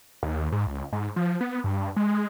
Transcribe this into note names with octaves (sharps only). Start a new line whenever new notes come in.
D#2
G#2
C#2
G#2
F3
B3
G2
G#3